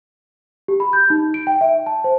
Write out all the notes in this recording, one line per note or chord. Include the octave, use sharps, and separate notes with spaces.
G4
B5
G6
D#4
D7
G5
E5
A5
C5